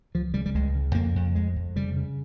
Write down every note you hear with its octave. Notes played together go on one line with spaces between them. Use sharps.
C#2 F3
C#3 G3
G3
C#2 G#3
C#3
F2 A#3
F2
F2 G#3
F2
C#3 G3
C#3